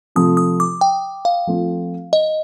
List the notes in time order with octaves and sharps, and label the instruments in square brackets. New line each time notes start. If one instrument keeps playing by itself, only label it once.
[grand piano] C3 F3 A3 [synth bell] D#6
[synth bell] D#6
D6
G5
F5
[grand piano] F3 A3 C4 F4
[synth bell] D#5